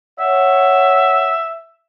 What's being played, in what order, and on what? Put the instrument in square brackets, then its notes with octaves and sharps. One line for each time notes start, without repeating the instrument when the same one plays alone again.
[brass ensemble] C#5 F#5 [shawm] E5